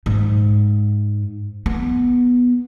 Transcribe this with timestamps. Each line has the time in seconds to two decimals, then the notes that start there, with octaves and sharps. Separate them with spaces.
0.06 G#2
1.66 B3